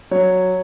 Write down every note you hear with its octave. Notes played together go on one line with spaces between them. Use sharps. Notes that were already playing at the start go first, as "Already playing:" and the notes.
F#3 C#5